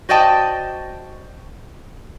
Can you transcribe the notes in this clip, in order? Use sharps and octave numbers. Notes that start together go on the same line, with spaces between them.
F#4 C5 D5 D#5 G5 A5